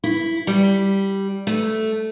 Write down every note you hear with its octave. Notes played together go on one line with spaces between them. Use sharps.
E4
G3
A3